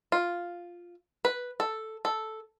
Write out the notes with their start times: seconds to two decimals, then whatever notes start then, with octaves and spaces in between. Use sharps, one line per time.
0.12 F4
1.25 B4
1.60 A4
2.05 A4